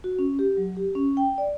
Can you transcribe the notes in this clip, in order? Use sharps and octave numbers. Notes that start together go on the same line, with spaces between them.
F#4
C#4
G4
F#3
G4
C#4
G5
D5